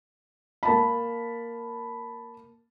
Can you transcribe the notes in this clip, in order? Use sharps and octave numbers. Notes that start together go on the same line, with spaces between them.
A#3 A5 B5